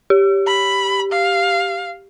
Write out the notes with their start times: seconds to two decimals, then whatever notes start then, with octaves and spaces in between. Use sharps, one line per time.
0.10 G4
0.47 B5
1.12 F5